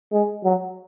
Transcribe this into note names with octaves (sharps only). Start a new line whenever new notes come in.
G#3
F#3